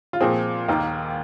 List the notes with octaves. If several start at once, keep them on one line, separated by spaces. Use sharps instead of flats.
F4
A#2 F3 C4 G#4
D#2 D#3 A#3